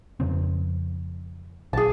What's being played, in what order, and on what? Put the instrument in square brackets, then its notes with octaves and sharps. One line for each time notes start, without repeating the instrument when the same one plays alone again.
[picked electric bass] F2 C#3 C4
[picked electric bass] B1 [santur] G#4 A5